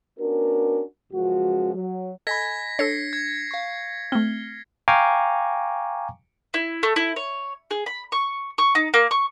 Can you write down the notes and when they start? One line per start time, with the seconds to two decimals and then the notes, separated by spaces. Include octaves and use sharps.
0.19 B3 C#4 D4 F#4 A#4
1.13 C#2 F#2 F3 G#3 F#4
1.75 F#3
2.27 A4 D#5 G#5 B5 G#6 A#6 B6
2.79 D4 A4 C#5 A#6 C7 C#7
3.13 G#6
3.51 F5 C#6
4.12 A3 C4 F6 G7
4.88 F5 G5 G#5 A#5 C#6 D6
6.54 E4
6.83 A3
6.96 E4
7.16 C#5
7.71 G#4
7.86 B5
8.12 C#6
8.58 C#6
8.75 D#4
8.94 A#3
9.11 C#6